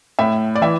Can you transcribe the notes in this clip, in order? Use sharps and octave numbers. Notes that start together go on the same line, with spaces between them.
A2 E5
D5
E3 E5